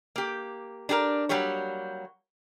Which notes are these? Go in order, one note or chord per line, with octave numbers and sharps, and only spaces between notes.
A#3 G4
D4 G4 G#4 A#4
F#3 G3 A#3 G4 C#5